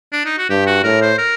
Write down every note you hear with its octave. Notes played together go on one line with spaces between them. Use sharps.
D4
D#4
F#4
G2 G4
F#4
A2 A#4
C5
A#4